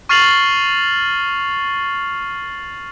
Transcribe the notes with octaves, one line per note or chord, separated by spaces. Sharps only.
C#6 F6 A6 C7 F7 F#7